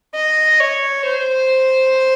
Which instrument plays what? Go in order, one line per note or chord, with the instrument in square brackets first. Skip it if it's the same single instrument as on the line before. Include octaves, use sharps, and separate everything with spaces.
[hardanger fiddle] D#5
C#5
C5